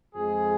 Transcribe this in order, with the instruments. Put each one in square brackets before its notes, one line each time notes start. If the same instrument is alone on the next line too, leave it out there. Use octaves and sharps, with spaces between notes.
[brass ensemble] F2 F3 G#3 G#4